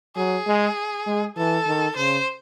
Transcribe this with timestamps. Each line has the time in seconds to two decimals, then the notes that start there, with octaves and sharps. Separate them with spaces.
0.16 F#3 G#4
0.47 G#3
1.06 G#3
1.37 E3 A4
1.67 D#3
1.96 C#3 C5